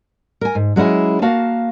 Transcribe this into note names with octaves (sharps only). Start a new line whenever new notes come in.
A#4 G#5
G#2
F#3 G#3 C#4 E4 G#4
A#3 F#4 F5 A5